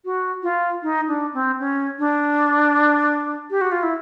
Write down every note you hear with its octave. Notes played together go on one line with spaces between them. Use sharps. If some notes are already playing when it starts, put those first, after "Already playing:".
F#4
F4
D#4
D4
C4
C#4
D4
G4
F#4
F4
E4